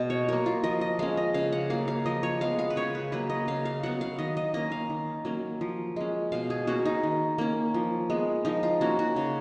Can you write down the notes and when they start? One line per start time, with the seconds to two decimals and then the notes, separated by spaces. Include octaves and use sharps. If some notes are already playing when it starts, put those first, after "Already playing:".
Already playing: B2 G#3 B3
0.10 C#5
0.28 F#3 A#3 A#4
0.46 F4
0.64 F3 D#5
0.81 D#5
0.99 G#3 C#4 F5
1.17 D#5
1.34 C#3 F5
1.52 F#5
1.70 F#3 A#3 F5
1.88 F5
2.06 F3 D#5
2.23 C#5
2.41 G#3 B3 F5
2.59 F5
2.70 B4
2.76 C#3 C#5
2.95 B4
3.12 F#3 A#3 B4
3.30 D#5
3.48 C#3 F5
3.65 F5
3.83 F#3 B3 F#5
4.01 F5
4.19 D#3 D#5
4.37 D#5
4.54 A#3 C#4 D#5
4.72 F5
4.90 D#3
5.25 F#3 A#3 C#4
5.61 F3
5.96 G#3 C#4
6.32 B2 F5
6.50 G#4
6.67 A#3 C#4 F#4
6.85 D#4
7.03 D#3
7.38 A#3 C#4
7.74 F3
8.10 G#3 B3
8.45 F3 D#4
8.63 F4
8.81 A#3 C#4 F#4
8.99 F#4
9.16 C#3